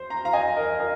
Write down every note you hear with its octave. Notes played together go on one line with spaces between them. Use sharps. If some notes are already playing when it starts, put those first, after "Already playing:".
Already playing: C5
A#5
F5 A#5
D#5 G#5
A#4 D#5
A#4 D#5